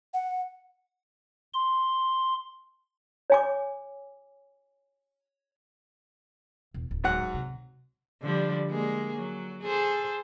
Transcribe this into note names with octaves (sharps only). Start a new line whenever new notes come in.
F#5
C6
C#5 G#5 D6
E1
D1
G#2 F#3 F#5
C3
D3 F3 G3
G#3 A#3 G#4
F#3
G#4 A4 C5